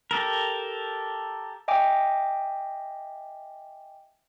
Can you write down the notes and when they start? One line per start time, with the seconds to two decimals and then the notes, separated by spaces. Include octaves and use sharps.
0.11 G4 A4 A#4
1.68 D#5 E5 G5 G#5 D6